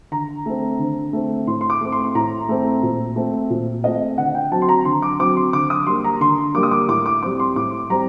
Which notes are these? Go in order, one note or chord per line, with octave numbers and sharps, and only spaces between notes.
D3 A#5
A3 C4
D3
A3 C4
A2 C6
C6
D6
A3 C4
C6
C6
A2 A#5
A3 C4
A#2
A3 C4
A#2
A3 C4 D#5
D3 F#5
G5
F#3 C4 A5
C6
A#5
D3 C6
D6
F#3 C4 D6
C6
D3 D6
D#6
G3 A#3 C6
A#5
D3 C6
G3 A#3 D6
D#6
D6
A2 D6
D6
G3 C4 D6
C6
A2 D6
G3 C4 A#5